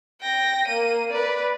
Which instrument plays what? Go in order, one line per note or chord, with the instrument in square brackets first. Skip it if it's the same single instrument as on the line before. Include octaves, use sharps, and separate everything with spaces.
[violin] G5 A#6
A#3 D#7
B4 D5